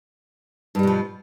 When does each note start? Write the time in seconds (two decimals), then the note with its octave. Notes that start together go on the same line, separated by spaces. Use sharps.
0.75 G2
0.79 G3
0.83 B2
0.87 F3